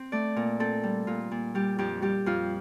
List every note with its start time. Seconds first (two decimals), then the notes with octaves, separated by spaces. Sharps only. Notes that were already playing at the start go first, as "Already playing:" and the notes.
Already playing: C4
0.12 A3 D5
0.36 A#2
0.60 C4 A4
0.84 G3
1.07 A#2 F4
1.31 A#2
1.55 G3 G4
1.78 F2 G4
2.02 G3 G4
2.26 F2 F4